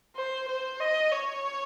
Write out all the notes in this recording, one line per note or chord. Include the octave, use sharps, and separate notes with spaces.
C5
C5
D#5
C#5